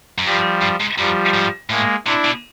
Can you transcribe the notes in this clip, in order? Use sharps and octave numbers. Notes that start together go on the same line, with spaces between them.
F#2
G2 F3 G3
G2
G#2
F#2 F3 G3
G#2
A2 G#3 A#3
C3 D4 E4
B2